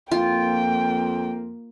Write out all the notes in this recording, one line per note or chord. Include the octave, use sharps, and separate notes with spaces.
F2 A#3 F4 G5